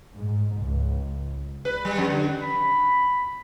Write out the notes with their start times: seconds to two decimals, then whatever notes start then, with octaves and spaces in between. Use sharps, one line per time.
0.13 G#2
0.61 C#2
1.65 B4
1.85 G3
1.98 F2
2.10 D3
2.42 B5